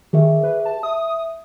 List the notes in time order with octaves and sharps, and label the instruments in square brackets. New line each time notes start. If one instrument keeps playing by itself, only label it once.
[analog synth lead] D#3 [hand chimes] G4 G#4 E5
[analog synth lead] B4
A5
[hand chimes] E5 [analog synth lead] D#6